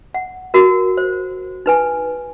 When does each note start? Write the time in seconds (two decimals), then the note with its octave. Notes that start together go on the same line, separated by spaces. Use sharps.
0.14 F#5
0.54 F#4 A#4
0.97 C5
1.66 D#4 B4 G#5